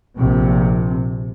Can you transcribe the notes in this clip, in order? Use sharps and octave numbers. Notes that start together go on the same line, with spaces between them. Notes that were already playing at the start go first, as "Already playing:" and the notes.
A#1 C3